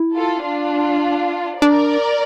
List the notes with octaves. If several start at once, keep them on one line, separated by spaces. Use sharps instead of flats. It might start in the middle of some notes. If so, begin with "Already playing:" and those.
Already playing: E4
F4 A4
D4 F4
D4 A#4 D5